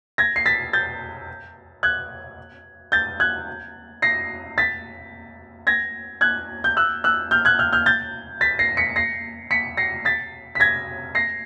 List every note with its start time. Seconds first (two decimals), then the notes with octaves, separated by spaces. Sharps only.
0.18 G#6 A#6
0.36 C7
0.46 A6 B6
0.73 G6 A6
1.83 F#6 G#6
2.92 G6 A6
3.20 F#6 G#6
4.02 A#6 C7
4.58 A6 B6
5.67 G#6 A#6
6.21 F#6 G#6
6.64 G6
6.77 E6 F#6
7.04 E6 F#6
7.31 F6 G6
7.45 F#6 G#6
7.59 F6 G6
7.72 F6 G6
7.86 G6 A6
8.41 A6 B6
8.59 A#6 C7
8.77 B6 C#7
8.96 A#6 C7
9.51 B6 C#7
9.77 A#6 C7
10.05 A6 B6
10.55 B6
10.60 G#6 A#6
11.15 A#6 C7